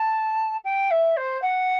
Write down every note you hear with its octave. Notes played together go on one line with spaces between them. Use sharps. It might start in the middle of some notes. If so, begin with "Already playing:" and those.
Already playing: A5
G5
E5
C5
F#5